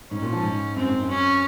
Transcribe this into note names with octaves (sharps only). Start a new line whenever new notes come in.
G#2 C#4
A#2
F3
G#2
F#2 C4
G#2
F#2
C#4